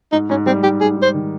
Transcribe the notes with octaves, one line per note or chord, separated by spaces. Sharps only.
G#2 D#4
G#2 C#4
G3 C4
G#2 G4
G#2 G#4
G#2
C5
D#3